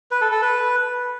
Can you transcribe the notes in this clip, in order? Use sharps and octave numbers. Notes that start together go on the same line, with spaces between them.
B4
A4
A4
B4